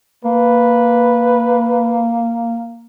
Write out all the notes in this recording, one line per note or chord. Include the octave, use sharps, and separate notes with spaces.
A#3 B4